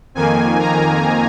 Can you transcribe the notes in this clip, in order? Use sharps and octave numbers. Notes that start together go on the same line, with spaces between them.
F2 D#3 A#3 G#5
A#5